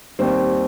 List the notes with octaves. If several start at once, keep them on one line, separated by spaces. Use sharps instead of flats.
D#2 D#3 G3 C4